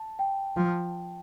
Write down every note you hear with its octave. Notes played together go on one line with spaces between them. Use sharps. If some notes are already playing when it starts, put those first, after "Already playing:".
Already playing: A5
G5
F3